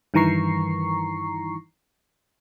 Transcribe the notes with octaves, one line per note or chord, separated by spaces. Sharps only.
G2 D#3 E3 A#5 C#6 C7